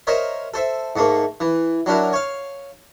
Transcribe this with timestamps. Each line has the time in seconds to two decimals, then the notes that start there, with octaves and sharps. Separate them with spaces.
0.07 A#4 C5 C#5 D#5 E5
0.54 A4 C5 E5
0.96 G#2 A3 A#3
1.40 E3
1.86 F#3 D4 E4 A#4
2.13 C#5 F5